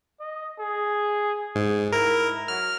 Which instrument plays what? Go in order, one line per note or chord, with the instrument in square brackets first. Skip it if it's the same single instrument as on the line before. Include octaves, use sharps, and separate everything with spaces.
[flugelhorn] D#5
G#4
[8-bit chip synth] G#2 [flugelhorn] G#4
[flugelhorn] E4 [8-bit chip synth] A#4
[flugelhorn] F#3 [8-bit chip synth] F6